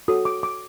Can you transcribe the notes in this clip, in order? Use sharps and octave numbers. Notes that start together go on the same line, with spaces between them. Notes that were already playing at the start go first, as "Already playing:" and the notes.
F#4 A4 C#5 D#6
D6
D6